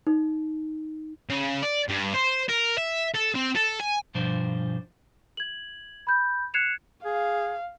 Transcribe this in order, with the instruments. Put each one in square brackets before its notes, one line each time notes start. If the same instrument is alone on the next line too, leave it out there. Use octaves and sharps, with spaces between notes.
[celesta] D#4
[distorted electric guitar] C#3
D5
G2
C5
A#4
E5
A4
C4
A4
G#5
[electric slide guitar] G2 B2 F3 D4 C5
[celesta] G#6 F#7
B5 G6
F#6 G#6 C7 C#7 E7 F7
[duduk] G#4 [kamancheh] F5